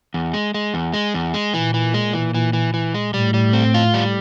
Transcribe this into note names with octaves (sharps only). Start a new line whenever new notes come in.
E2
G#3
G#3
E2
G#3
E2
G#3
A#2 E3
E3
G#3
E3
E3
E3
E3
G#3
A2 G3
G3
C4
F4
G3